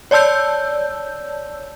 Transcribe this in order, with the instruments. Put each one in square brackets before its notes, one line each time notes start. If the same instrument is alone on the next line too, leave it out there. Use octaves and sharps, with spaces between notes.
[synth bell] C#5 D5 A5 E6 G6